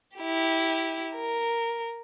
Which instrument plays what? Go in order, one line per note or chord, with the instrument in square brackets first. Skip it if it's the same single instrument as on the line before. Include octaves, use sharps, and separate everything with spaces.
[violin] E4 G4
A#4